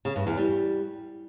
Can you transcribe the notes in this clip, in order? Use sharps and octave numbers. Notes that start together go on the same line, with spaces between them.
C#3
G2
E2
G3